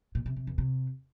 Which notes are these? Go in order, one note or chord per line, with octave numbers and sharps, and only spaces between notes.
A#2
C3
C3
E2
C3